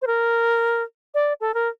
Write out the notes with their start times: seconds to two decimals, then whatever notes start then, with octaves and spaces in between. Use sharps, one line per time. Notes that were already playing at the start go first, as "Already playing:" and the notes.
0.02 C5
0.07 A#4
1.14 D5
1.40 A4
1.54 A#4